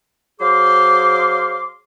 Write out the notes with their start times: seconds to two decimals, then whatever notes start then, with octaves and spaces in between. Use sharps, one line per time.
0.41 F#3 G#4 C5 F5 C6 D6